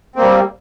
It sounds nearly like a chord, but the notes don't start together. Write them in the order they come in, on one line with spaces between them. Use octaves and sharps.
C4 A#3 G3